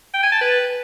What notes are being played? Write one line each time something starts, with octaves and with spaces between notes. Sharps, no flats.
G5
G#5
A5
B4